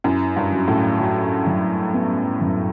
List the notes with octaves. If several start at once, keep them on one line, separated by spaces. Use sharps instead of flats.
F#2 E4
G2
F#3
A2
F#3
F#2
B3
F#2